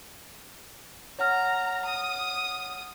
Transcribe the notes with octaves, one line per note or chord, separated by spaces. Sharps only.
C#5 F#5 A#5 F6
D#6